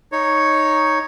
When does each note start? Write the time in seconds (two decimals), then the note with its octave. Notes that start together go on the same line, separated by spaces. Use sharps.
0.12 D#4 C#5